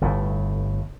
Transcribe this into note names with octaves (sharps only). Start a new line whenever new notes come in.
G1 A2